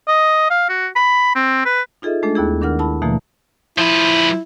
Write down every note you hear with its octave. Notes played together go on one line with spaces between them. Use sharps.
D#5
F5
F#4
B5
C4
B4
D#4 F4 G#4 A4 D#5 E5
G#3 A3 D4 A4
D#2 B3 E4 G#4
D#3 D4 A#4 F#5 F6
E4 A5 B5
B2 D3 E3 F3 A3 A#3
F3 E4 B4